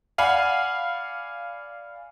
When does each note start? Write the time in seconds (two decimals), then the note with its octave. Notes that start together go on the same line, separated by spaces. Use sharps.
0.18 D5 F5 F#5 G#5 B5